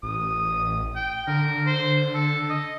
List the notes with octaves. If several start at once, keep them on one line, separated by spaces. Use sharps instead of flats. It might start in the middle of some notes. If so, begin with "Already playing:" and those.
A1 D#6
G5
D3 A#4
C5
A4
D#5